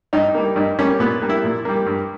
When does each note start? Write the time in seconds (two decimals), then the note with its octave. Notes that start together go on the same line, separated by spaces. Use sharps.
0.13 G2 D#4
0.35 G3 A#3
0.56 G2 D#4
0.79 G3 A#3 C#4
1.00 A#2 B3
1.22 G3 A#3
1.29 E4
1.44 A#2
1.65 G3 A#3
1.86 G2